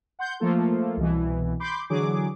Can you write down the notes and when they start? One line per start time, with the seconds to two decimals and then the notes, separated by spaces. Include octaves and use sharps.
0.19 F#5 C6 G6
0.40 F3 A3 A#3 F4 A4
0.97 C2 B2 E3
1.60 B5 C6 D6 G6
1.90 D3 E3 F#3 G#4 D6